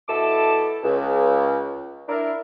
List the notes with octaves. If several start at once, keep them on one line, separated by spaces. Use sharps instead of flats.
B2 E4 A4 E5 A5 D6
C#2
D4 E4 A#4